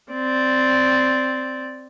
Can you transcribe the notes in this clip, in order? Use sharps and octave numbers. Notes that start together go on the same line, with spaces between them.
C4 D5